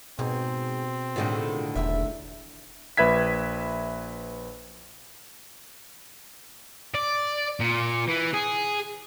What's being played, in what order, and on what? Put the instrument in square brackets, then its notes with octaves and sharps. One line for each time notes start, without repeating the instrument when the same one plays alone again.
[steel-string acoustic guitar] G#2 G#4 [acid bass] B2 [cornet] C4
[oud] A2 D3 D#3 [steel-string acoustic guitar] F4 G#4
[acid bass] E1 [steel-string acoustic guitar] E2 E5
[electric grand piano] A#1 B4 E5 G#6 B6
[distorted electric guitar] D5
A#2
E3
G#4